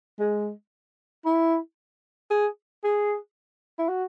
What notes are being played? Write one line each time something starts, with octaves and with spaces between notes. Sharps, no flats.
G#3
E4
G#4
G#4
E4
F#4